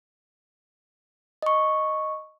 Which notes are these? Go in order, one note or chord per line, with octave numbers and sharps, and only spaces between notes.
D#5 C#6